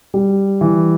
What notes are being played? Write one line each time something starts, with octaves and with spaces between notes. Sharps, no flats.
G3
E3